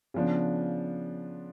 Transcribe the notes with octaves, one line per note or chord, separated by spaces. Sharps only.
C#3 F3 B3 D4